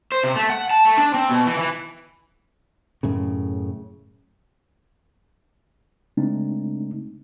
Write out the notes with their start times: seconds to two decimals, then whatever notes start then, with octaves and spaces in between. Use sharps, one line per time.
0.12 C5
0.24 C3
0.35 A3
0.50 F#5
0.71 A5
0.85 A3
0.97 D4
1.14 C4
1.29 B2
1.47 E3
1.59 E3
3.03 F#2 A2 C#3
6.17 C#3 G#3 A3 C4 D4 D#4